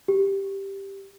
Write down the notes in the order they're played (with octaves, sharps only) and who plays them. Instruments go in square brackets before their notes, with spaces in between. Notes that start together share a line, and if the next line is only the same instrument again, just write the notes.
[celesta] G4